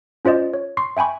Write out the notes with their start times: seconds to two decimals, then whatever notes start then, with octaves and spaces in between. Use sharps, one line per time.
0.25 C#4 F4 C5 D5 D#5
0.54 C#5
0.77 C6 C#6 C7
0.97 E5 G5 G#5 B5 C#6